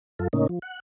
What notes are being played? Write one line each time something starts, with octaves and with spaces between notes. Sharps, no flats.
F#2 F4 A4
A2 C#3 A#3 C#4 D#4
F3
F#5